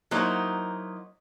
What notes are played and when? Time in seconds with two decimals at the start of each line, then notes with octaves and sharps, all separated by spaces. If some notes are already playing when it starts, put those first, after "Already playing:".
0.11 F#3 A#3 D#4 E4 C5